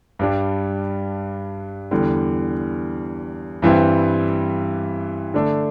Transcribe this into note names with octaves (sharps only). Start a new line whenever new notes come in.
G2 G3 D4
E2 D3 G3
G2 E3 G3 C4 E4
D3 A3 D4 A4